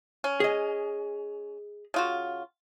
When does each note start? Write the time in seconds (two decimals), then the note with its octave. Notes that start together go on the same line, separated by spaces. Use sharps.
0.24 C#4
0.40 G#4 D#5
1.94 C#3 F4 F#4